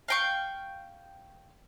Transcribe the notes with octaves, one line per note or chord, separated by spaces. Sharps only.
F5 G5 C#6